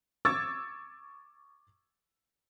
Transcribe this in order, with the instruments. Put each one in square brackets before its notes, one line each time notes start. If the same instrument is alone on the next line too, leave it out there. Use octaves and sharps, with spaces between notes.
[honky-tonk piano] C#6 D6 E6 G#6 A6